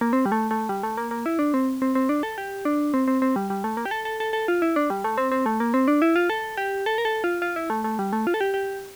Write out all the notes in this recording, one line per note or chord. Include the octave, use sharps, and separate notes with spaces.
A#3
C4
G3
A3
A3
G3
A3
A#3
A#3
E4
D4
C4
C4
C4
D4
A4
G4
D4
C4
C4
C4
G3
G3
A3
A#3
G4
A4
A4
A4
A4
F4
E4
D4
G3
A3
C4
C4
A3
A#3
C4
D4
E4
F4
A4
G4
A4
A#4
A4
F4
F4
E4
A3
A3
G3
A3
F4
A4
G4
G4